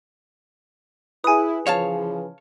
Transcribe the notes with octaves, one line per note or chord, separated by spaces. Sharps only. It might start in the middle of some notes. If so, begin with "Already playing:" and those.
E4 G#4 B4 G#5 D#6
C#3 E3 F3 C#5 F5 A5